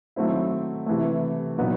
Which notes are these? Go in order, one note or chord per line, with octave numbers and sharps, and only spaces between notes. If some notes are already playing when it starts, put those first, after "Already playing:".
D#3 F#3 A3 C4 E4
C3 E3 A3
A#2 F#3 B3 D#4